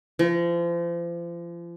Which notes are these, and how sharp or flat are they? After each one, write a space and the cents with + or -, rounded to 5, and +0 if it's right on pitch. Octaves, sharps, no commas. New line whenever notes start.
F3 -35